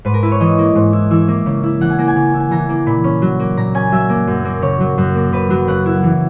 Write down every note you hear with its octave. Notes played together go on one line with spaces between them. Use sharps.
G#2 B4
A#4
E4 B4
C#5
E3 D#5
A#3
G#2
E4
E3 E5
A#3
C#3
E4
E3 F#5
G#5
A#3 A#5
G#5
C#3
E4
G#5
E3 A#5
A#3
A#2 B5
C#4
F#3
A#3
A#2 A#5
C#4 G#5
F#3 E5
A#3
F#2
A#3
C#3 C#5
F#3
F#2
A#3
C#3 B4
F#3
C#3 F#5
E4
E3